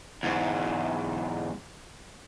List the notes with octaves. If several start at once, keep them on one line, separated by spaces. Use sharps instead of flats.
E2 G#2